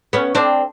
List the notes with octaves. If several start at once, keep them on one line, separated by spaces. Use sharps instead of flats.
B3 C#4
C4 D4